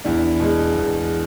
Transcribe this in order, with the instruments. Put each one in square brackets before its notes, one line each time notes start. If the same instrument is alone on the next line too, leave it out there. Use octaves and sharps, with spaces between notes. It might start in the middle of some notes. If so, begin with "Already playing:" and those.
[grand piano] E2 D4 E4
B2 G#3
E2